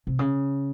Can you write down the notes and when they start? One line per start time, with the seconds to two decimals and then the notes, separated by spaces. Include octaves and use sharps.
0.07 C3
0.19 C#3